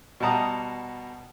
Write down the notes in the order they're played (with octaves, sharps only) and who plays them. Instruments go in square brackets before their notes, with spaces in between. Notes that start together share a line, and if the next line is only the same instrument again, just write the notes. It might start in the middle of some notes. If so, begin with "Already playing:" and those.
[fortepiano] B2 G3 F#5 A5 A#5 D#6